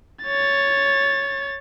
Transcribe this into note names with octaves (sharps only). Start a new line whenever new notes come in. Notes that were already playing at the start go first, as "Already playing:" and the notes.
C#5 A6